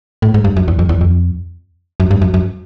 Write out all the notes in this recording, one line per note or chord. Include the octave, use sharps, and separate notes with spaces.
A2
G#2
G2
F#2
E2
F2
E2
F2
F#2
G2
F#2
F#2